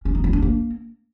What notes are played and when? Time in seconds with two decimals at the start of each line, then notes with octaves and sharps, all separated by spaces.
0.05 C#4
0.15 D#4
0.24 E4
0.33 D4
0.42 A#3